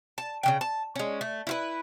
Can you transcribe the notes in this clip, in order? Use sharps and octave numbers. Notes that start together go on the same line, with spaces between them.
A5
C#3 E3 G5
A5
G#3 C#4
A3
E4 F4 B4